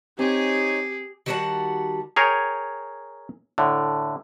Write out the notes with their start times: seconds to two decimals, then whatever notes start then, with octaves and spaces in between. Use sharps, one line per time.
0.19 C4 D#4 G4 G#4 C#5 G#5
1.26 D#3 G3 F#4 A#4 F#5 A5
2.16 G#4 A#4 C#5 G5
3.58 A2 D3